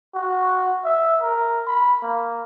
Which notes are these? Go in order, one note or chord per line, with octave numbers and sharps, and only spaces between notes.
F#4
E5
A#4
B5
A#3